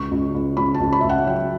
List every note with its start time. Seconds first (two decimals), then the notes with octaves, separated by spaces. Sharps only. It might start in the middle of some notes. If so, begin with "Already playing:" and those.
Already playing: C#2 C#6
0.11 C#2
0.34 C#2
0.57 C#2 B5
0.74 A5
0.80 C#2
0.93 B5
1.01 E5
1.04 C#2
1.09 F#5
1.26 F#3 G5